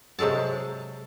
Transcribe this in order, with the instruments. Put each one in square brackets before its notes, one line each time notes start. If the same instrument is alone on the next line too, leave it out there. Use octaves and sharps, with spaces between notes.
[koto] C3 F#3 G#3 A4 A5